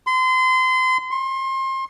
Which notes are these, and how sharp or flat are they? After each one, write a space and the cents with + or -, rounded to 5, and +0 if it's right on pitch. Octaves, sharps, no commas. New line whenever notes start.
C6 -30
C6 +30